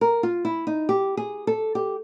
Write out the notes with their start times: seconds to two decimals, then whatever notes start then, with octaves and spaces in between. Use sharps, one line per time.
0.01 A#4
0.23 F4
0.45 E4
0.67 D#4
0.89 G4
1.17 G#4
1.47 A4
1.75 G4